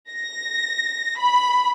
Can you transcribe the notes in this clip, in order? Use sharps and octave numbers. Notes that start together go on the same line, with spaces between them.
A#6
B5